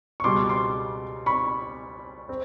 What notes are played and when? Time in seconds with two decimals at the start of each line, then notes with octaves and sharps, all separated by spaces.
0.20 C#6
0.24 C#2 B2 G3 C6 D6
0.49 C6 D6
1.26 B5 C#6
2.29 C4